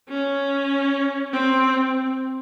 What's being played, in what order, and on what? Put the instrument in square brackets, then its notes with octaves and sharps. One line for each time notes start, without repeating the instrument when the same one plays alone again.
[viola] C#4
C4